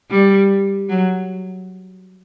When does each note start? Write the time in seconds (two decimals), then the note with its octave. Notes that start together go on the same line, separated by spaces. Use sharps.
0.10 G3
0.89 F#3